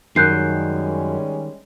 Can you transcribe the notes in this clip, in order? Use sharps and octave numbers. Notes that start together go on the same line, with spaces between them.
F#2 D#3 G3 G#3 C#4 F#6 G6 C7